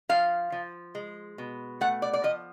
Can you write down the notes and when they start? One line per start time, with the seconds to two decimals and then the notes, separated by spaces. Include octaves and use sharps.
0.09 F3 F5
0.52 F3
0.95 G#3
1.38 B2
1.81 A3 F#5
2.02 D5
2.13 D5
2.24 F3 D#5